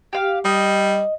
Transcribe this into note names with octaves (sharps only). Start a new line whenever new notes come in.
G4 F5
G3 D#5